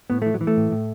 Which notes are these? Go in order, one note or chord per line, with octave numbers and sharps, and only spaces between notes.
A2 B3
E3 A3
F#3
E3
A3
A2
A2